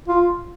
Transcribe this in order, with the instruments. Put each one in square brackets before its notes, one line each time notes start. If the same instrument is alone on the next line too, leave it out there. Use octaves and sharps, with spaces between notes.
[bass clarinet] F4